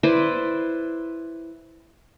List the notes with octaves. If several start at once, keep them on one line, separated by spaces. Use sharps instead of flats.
E4 B4 C5 D5